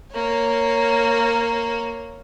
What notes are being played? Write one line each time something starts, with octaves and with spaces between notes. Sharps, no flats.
A#3 C#5